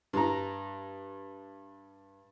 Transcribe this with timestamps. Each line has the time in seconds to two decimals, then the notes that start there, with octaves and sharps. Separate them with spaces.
0.13 G2 A#5